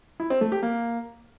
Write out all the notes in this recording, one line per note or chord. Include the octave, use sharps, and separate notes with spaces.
E4
C4
A3
G4
A#3